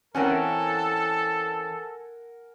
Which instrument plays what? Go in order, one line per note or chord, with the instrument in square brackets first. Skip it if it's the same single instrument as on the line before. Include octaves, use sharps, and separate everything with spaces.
[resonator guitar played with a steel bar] E3 C4 C#4 [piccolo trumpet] A4 [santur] A#4 F#5 G#5